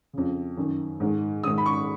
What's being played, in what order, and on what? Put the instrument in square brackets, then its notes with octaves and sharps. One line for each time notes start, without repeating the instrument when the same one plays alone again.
[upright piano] F2 C#3
F#2 D#3
G#2 D#3
G#2 D#3 D#6
B5
C#6